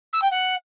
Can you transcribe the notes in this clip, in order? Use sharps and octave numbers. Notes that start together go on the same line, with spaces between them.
E6
G5
F#5